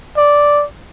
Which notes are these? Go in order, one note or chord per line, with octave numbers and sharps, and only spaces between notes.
D5